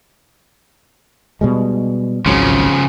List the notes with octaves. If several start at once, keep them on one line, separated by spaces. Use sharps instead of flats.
B2 G3 G#3
G#1 C#2 C#3 F3 F#3